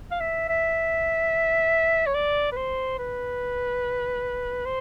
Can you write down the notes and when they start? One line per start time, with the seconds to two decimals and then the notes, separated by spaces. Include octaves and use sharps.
0.11 F5
0.20 E5
0.49 E5
2.06 C#5
2.15 D5
2.52 B4
2.56 C5
2.98 B4
4.65 C5